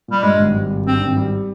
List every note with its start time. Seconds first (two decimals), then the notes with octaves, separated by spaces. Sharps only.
0.08 A#2 G3
0.23 G2 G#3
0.39 G#1
0.55 G3
0.71 G#1
0.86 G2 C4
1.01 G#1
1.17 G3